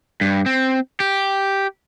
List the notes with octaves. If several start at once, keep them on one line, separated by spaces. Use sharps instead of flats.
G2
C4
G4